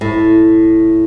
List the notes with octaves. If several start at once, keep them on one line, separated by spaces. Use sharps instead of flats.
A2